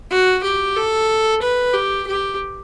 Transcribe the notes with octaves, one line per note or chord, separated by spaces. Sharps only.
F#4
G4
A4
B4
G4
G4